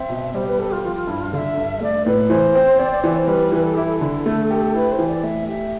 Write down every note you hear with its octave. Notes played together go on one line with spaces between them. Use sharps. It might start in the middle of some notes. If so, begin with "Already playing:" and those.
Already playing: C4 E5
B2
G3 C5
B4
G4 A4
F4
F3 F4
F4
G2 E4
F4
D3 E5 F5
G2
A3 D5
A2 B4
E3 C5
C4
C4 D5
D5
E3 D5
C5
G3 B4
E3 B4
A4
E4 G4
A4
D3
A3
G4
E4 B4
C5
E3
D5
A3 E5
G4 E5